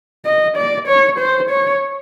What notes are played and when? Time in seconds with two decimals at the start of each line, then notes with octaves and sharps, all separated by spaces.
0.26 D#5
0.56 D5
0.88 C#5
1.19 C5
1.50 C#5